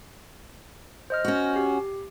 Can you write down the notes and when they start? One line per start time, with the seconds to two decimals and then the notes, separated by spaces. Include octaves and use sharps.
1.10 C5 D#5 F6
1.25 C#4 F#4
1.56 G4